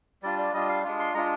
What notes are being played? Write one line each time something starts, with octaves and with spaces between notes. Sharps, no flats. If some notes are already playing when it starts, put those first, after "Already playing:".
G3 D4 F4 D5
D5
G3 D4 F4 D#5
F5
G#3 D4 F4
C6
G#3 D4 F4 A#5